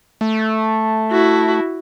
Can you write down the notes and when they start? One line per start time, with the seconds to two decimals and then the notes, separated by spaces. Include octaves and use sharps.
0.21 A3
1.11 E4 F#4